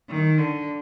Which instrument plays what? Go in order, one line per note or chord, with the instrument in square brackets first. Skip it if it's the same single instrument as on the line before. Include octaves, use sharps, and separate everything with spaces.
[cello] D#3
D3